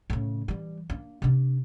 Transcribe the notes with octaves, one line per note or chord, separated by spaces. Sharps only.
A2 C#3
E3 G3
A#3 D4
C3 D4